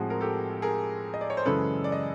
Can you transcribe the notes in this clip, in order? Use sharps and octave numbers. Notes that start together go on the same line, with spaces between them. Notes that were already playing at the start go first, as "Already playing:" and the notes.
Already playing: A2 F3 G#3 C4 F#4 G#4
A#4
G4 A4
G#4 A#4
D#5
D5
C#5
C5
F#2 C#3 E3 G#3 C#4 A4 B4
D5
D#5